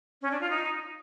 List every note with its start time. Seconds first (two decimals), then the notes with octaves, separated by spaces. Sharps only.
0.22 C#4
0.31 D4
0.41 F4
0.50 D#4